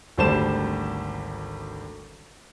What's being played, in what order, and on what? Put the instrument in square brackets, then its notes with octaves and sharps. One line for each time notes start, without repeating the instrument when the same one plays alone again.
[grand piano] G#1 D2 G3 C5 A5 E7